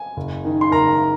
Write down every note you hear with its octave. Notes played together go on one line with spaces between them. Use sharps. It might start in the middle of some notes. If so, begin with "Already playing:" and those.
Already playing: G#5
F#1
D#3
C6
F#1 A#4 A#5